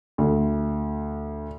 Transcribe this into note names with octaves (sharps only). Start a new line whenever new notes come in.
D2